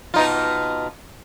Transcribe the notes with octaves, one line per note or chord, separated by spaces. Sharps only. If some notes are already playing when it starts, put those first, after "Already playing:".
B2 D#4 F4